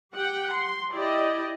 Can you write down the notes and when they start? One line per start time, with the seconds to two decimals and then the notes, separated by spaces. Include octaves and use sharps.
0.13 G4 F#5 G5
0.54 C6
0.93 E4 G4 D5 D#5